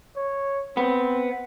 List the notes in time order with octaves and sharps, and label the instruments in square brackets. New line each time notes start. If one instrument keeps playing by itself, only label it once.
[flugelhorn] C#5
[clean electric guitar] B3 [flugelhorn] C4